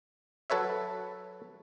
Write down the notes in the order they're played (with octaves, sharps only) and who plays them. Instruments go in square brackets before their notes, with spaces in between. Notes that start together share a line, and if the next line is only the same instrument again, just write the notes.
[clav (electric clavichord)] F#3 A4 B4 C#5 E5